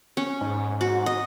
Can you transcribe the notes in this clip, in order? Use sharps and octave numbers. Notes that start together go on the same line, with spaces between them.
C#4
G#2
F#4
D#5